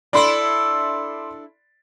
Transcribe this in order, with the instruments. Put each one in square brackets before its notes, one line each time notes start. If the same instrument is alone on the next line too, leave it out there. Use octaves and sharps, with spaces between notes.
[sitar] D4 E4 A4 [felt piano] D5 B5 C6